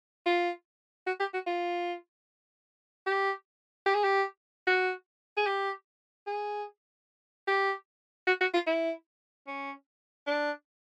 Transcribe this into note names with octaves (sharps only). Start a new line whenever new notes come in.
F4
F#4
G4
F#4
F4
G4
G4
G#4
G4
F#4
G#4
G4
G#4
G4
F#4
F#4
F4
E4
C#4
D4